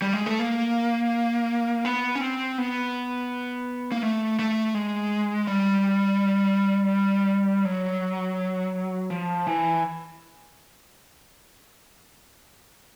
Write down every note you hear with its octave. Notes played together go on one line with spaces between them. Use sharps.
G3
G#3
A3
A#3
B3
C#4
C4
B3
A#3
A3
A3
G#3
G3
F#3
F3
E3